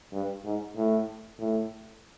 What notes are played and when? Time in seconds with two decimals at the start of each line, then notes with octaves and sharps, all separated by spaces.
0.13 G2
0.45 G#2
0.76 A2
1.39 A2